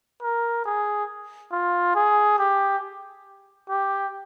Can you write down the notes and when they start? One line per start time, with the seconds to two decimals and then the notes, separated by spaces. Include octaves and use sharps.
0.22 A#4
0.65 G#4
1.52 F4
1.95 G#4
2.39 G4
3.69 G4